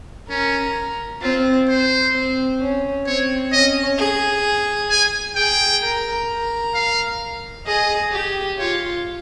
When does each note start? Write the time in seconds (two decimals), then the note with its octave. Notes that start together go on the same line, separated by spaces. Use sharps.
0.29 C#4 A#4
1.22 C4 F4
1.68 C5
2.14 C4
2.60 C#4
3.06 C4 C#5
3.52 C#4 D#5
3.98 G#4
4.90 G#5
5.36 G#4 G5
5.82 A#4
6.28 A#4
6.74 F5
7.67 G#4 D#5
8.12 G4
8.58 F4 C#5